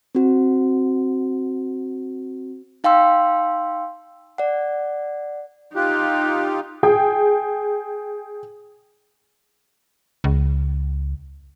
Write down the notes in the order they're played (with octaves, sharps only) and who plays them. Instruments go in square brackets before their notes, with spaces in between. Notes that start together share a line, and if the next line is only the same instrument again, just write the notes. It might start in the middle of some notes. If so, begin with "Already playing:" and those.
[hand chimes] C4 F#4
D#4 F5 G5 C6 E6
D5 F#5
[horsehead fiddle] D#4 [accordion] F4 G4 [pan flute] F#6
[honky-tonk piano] G#4 G5
[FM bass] C#2